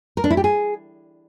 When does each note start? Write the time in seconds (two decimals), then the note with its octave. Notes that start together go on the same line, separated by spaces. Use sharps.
0.17 A#4
0.24 D4
0.30 E4
0.37 G4
0.44 G#4